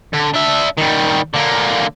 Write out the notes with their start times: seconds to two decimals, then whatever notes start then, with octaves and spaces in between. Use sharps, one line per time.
0.14 D3
0.34 D4 E5
0.78 D#3 G3
1.34 D3 A#3